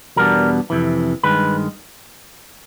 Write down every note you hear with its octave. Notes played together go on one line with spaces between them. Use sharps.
E2 B2 G3 B3 D4 A#4
F2 C3 E3
G2 D#3 G#3 B4